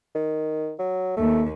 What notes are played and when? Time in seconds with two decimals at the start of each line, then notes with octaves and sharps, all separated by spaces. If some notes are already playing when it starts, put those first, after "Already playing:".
0.15 D#3
0.79 F#3
1.17 D#2 A3